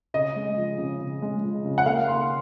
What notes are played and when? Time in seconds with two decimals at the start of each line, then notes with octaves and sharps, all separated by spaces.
0.14 C#3 D#5
0.36 G#3
0.57 F3
0.78 C#3
1.00 C#3
1.22 G#3
1.44 F3
1.65 C#3
1.78 F#5
1.86 A#3 F5
2.08 D#3 C6